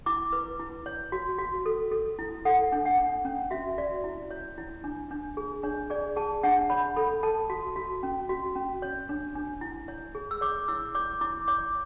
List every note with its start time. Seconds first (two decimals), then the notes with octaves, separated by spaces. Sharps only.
0.06 E4 D6
0.33 B4
0.60 E4
0.86 C#5
1.12 F#4
1.38 F#4
1.66 A4
1.91 A4
2.19 E4
2.45 A4 F#5
2.72 D4
2.86 F#5
2.98 D4
3.25 C#4
3.51 F#4 E5
3.78 F#4 D5
4.04 E4
4.31 C#5
4.58 E4
4.84 D4
5.11 D4
5.37 G#4
5.63 D4 C#5
5.90 G#4 D5
6.16 G#4 A5
6.43 D4 F#5
6.70 C#5 B5
6.96 A4 B5
7.23 A4 A5
7.50 F#4
7.76 F#4
8.03 C#4
8.29 F#4
8.56 C#4
8.82 C#5
9.09 D4
9.35 D4
9.61 E4
9.88 C#5
10.15 G#4
10.31 E6
10.41 C#5 D6
10.68 E4 E6
10.95 C#5 D6
11.21 E4 D6
11.48 C#5 D6